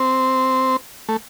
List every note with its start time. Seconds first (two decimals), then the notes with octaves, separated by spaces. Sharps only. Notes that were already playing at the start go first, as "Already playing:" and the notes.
Already playing: C4
1.09 A3